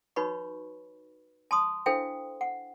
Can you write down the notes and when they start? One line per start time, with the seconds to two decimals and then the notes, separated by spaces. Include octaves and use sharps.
0.16 D#4 F#4 B4 C#5 B5 C#6
1.51 A5 C6 D#6
1.86 D4 E4 A4 C5 F5 G5
2.41 F#5